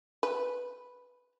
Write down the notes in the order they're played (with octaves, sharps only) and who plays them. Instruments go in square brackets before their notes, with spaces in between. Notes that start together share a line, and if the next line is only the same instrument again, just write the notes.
[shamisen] B4